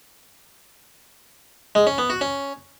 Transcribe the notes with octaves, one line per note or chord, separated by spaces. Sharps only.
G#3
C#4
B3
F#4
C#4